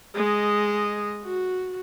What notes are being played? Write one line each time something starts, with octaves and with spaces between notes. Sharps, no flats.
G#3 D#5
F#4